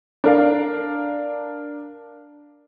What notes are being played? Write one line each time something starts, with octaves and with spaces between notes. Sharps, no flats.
D4 A#4 F5